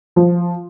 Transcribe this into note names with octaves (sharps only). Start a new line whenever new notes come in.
F3